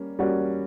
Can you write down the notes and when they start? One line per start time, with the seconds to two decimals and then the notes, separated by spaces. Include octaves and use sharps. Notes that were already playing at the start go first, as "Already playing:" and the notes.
Already playing: G3 A#3 C#4
0.19 G3 A#3 C#4 F#4